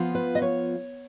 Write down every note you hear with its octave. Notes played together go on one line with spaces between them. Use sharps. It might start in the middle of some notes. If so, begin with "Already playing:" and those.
Already playing: F3 B3 F4
B4
D#5
C#5